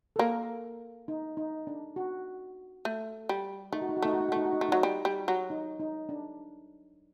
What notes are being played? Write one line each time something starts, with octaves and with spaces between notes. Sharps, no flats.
A4
A#3 A#4
D#4
D#4
D4
F#4
A3
G3
A3 D#4
F#4
D#4
F#4
A3 D#4
F#4
D#4
F#4
A3 D#4
F#4
D#4
A3 F#4
F#3 D#4
G3
G3
F#3
D#4
D#4
D4